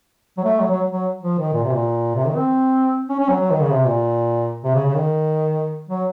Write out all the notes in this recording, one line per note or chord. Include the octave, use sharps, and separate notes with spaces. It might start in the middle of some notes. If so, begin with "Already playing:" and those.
F#3
A3
F#3
F#3
F#3
F3
D#3
A#2
C3
A#2
C3
D#3
C4
C#4
C#4
F#3
F#3
D#3
C#3
C3
A#2
C3
C#3
C#3
D#3
F#3